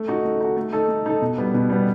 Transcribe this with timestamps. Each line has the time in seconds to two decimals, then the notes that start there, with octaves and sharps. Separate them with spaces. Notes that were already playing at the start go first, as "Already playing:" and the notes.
Already playing: A3
0.08 D#4 F#4
0.25 A3
0.40 D#4 F#4
0.57 A3
0.73 D#4 A4
0.88 A3
1.06 D#4 A4
1.22 B2
1.38 G3 B3
1.54 B2
1.70 G3 B3